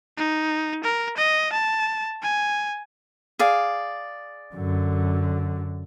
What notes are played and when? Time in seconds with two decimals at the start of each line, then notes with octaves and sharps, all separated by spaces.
0.17 D#4
0.84 A#4
1.17 D#5
1.52 A5
2.22 G#5
3.39 G#4 D5 F5
4.55 F#2 D3